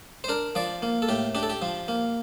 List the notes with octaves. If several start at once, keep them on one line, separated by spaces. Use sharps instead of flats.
C5
D4 A#4
F3 D5
A#3
A4
A2 G4
D4 G4
A4
G4
F3
A#3